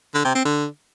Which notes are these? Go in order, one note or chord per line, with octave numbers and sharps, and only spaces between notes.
D3
C3
C4
D3